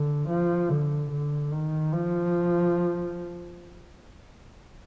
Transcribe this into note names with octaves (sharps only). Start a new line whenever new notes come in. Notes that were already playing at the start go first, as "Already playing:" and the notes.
Already playing: D3
F3
D3
D3
D#3
F3